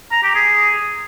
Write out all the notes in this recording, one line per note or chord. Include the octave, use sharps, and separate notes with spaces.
A#5
G4
G#4